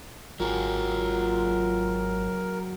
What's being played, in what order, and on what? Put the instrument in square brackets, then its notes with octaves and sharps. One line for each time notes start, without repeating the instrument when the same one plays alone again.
[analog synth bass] G#1 [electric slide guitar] F#3 F#4 G#4 [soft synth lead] F4 [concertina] A#4